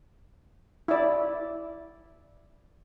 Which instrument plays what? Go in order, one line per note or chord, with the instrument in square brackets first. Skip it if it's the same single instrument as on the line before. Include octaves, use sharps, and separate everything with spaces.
[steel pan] E4 D5